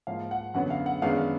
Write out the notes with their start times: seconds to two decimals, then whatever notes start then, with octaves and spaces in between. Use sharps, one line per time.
0.07 G#2 F3 A#3 F5
0.31 F#5
0.54 F#2 D3 F#3 B3 F#5
0.70 F5
0.86 F#5
1.02 F#2 D#3 G#3 B3 D4 F5